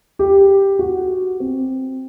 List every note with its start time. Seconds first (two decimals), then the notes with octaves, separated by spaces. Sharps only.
0.19 G4
0.79 F#4
1.40 C4